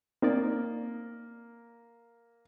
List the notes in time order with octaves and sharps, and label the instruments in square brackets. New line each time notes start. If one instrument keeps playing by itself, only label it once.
[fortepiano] A#3 [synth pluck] C4 D#4 D5